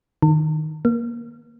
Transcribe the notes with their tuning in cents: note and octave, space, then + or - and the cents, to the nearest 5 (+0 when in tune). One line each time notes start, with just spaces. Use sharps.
D#3 -10
A#3 +15